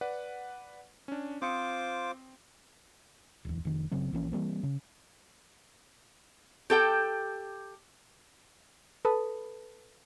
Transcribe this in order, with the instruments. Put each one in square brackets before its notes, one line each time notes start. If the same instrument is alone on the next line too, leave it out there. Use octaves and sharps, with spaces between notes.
[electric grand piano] B4 D5 F#5
C#4 D4
[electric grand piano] C4 D#6 C#7 [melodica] F4 C5 D6
[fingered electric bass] D1 E2
F1 D#3
F#1 C#3 F#3 C4
A#1 E3 A#3 C#4
E3 G3 A#3 C4
C#3
[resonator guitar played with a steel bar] G4 A4 G5
[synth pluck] A4 B4 A5 B5 D#6